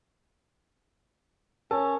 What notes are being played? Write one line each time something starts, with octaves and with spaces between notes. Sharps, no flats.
C#4 A#4 A5